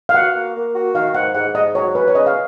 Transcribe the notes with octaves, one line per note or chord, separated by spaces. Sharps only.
F5
F#4 F#5
A#3
A#3
F#4
D#3 F5
G#2 F#5
G#2 F#5
G#2 D#5
F#3 C#5
C#4 B4
C#5
C#3 D#5
F5